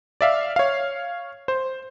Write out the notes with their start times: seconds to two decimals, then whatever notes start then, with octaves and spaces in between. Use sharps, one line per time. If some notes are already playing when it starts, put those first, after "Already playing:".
0.21 D5 E5 F5
0.56 C#5 F5
1.48 C5